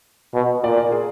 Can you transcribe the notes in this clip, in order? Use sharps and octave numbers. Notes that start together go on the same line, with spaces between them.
B2
A#2 D5
A#4
G#4